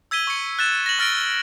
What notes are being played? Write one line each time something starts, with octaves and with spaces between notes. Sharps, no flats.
E6 G#6 B6 D#7 G7
C#6 C#7
F#6 A6 E7
A#6 F#7
C#6 F6 A6 A#6 D7 G7